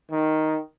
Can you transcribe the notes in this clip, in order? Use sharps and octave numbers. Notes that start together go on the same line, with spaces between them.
D#3